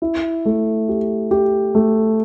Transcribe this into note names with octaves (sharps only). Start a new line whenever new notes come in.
E4
A3
G4
G4
A3